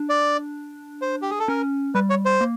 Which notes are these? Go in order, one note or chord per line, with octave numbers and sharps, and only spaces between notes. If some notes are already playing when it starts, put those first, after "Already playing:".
Already playing: D4
D5
C5
G4
G#4
A4
C#4 A#4
G3 B4
C#5
C5
A#3